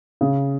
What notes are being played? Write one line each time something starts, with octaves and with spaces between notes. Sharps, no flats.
C#3